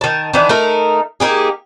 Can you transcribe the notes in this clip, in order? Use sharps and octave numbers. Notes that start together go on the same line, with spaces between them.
D#3 A5
D#3 E3 D4
A3 D#4 A#4
A#3 D#4 G4 G#4